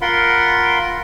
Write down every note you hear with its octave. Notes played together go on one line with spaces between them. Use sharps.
F4 A#4 F#5 B5 C6